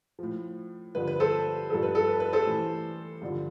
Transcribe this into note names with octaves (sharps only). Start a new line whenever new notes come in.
A2 F3
G2 D3 F3 B4
B4
A4 C5
G2 F3 A4
B4
A4
B4
B4
A4 C5
A2 E3
G2 D3 F3